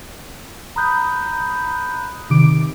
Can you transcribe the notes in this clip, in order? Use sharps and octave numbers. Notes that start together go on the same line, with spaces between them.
A#5 B5 D#6 F#6 G6
C3 D#3 D6 D7